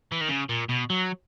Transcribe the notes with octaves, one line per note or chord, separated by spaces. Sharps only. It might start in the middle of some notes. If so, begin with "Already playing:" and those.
E3
D#3
C#3
A#2
B2
F#3